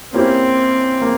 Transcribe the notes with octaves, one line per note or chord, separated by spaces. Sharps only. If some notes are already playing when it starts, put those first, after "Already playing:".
A#3 C4 C#4 E4 G4 C5
A#3